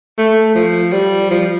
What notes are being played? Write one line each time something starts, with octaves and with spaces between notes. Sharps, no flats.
A3
F3
G3
F3